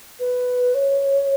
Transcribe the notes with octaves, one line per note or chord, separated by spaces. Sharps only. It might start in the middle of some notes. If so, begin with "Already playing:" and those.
B4
C#5